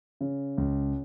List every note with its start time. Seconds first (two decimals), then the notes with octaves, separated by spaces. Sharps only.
0.21 C#3
0.58 C#2